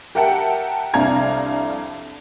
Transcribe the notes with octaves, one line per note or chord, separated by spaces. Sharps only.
G4 A#4 E5 F#5 G5 A5
C2 F2 D4 F5 A#5 G#6